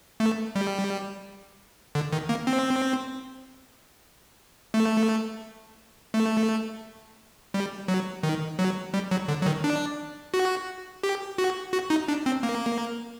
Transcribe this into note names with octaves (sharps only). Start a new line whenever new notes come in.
A3
G3
D3
D#3
A#3
C4
A3
A3
G3
F#3
D#3
F#3
G3
F#3
D3
F#3
D#3
D4
F#4
G4
F#4
F#4
D#4
D4
C4
A#3